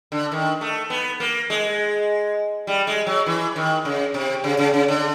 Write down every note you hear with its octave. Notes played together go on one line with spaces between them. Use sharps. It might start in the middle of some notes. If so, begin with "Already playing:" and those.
D3
D#3
A3
B3
A#3
G#3
G3
G#3
F#3
E3
D#3
C#3
C3
C#3
C#3
C#3
D3